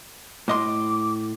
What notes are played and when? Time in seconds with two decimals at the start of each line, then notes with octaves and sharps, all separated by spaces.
0.48 A2 D#5 C6 D6